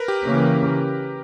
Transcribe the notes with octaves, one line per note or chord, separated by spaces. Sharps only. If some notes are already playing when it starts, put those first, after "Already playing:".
Already playing: A#4 B4
G4
C#3 E3 A#3 C#4